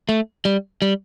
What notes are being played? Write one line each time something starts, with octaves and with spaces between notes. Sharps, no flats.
A3
G3
G3